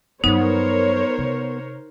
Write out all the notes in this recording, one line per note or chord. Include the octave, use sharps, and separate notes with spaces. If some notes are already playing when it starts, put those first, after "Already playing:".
G2 F#3 B3 D#4 A#4 C5 C#5
C3